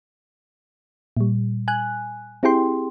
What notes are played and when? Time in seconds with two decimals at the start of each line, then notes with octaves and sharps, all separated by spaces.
1.17 A#2 G3
1.68 G#5 F#6
2.43 C4 E4 G4 G#4 G5 C6